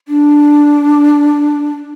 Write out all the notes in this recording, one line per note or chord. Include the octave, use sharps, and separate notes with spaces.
D4